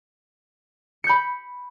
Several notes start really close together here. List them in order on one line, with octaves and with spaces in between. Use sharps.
C#7 G6 B5